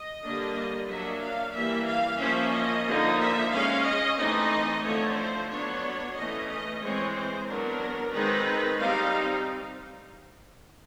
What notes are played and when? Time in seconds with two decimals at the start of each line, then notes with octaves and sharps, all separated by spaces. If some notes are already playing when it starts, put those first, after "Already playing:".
Already playing: D#5
0.23 D3 G3 A#3 D4
0.89 F#3 A#3 D4 E5
1.22 F5
1.55 E3 G3 A#3 E5
1.88 F5
2.21 F3 A#3 C#4 E5
2.54 D#5
2.86 D3 F3 A#3 D#4
3.20 E5
3.52 G#3 C#4 F5
3.86 D#5
4.19 E3 A3 C4 D#4 D#5
4.84 D3 F3 A3 C#5
5.17 C5
5.50 F#3 B3 D4 C#5
6.16 E3 A3 C#4 D#5
6.50 D#5
6.83 E3 G#3 C4 C#5
7.15 C5
7.48 F#3 B3 D4 A#4
8.14 D#3 G#3 C4 D#4 B4
8.80 G3 C4 D#4 F5